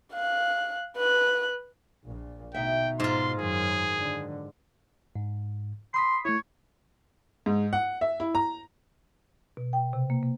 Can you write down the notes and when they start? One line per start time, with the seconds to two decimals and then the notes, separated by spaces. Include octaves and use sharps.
0.13 F5 F#6
0.96 B4 F#6
2.05 A#1 A#2
2.54 D2 B2 D#4 E5 G5
3.00 G#2 F4 C6
3.39 F#2 D#3 F#3 G#4
3.98 D3
5.16 G#2
5.94 B5 C6 D#6 B6
6.25 A3 E4 C#5
7.46 G#2
7.73 F#5
8.01 E5
8.20 E4
8.35 A#5
9.57 B2
9.73 G5
9.93 C3
10.10 A#3
10.23 A#3